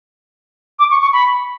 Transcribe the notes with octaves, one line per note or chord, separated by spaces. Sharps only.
D6
C#6
C#6
B5